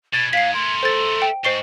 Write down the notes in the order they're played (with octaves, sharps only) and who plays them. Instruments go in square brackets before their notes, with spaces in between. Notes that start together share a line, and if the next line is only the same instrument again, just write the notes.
[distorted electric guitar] B2 [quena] G#6 [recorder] A6
[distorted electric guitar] G#2 [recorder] F5 [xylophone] B6 C7
[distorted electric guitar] A3 A#4 [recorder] C6
[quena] A4 [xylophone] C5 A6
[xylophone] G5
[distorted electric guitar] G#2 [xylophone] C5 C7 G7 [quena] D#5 [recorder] C#6